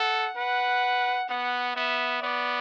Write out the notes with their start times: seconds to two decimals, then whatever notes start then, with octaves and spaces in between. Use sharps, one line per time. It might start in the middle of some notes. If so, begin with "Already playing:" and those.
Already playing: A4 F#5
0.37 B4 F#5
1.29 B3 F#5
1.76 B3 E5
2.22 B3 D5